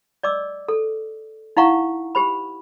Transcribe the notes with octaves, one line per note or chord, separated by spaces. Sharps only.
D5 D#5 D6 E6
A4
D#4 E4 F5 F#5 A#5 C#6
G4 C5 B5